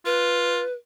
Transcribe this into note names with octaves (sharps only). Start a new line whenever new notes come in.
F4 B4